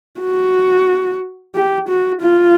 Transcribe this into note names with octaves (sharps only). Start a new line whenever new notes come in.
F#4
G4
F#4
F4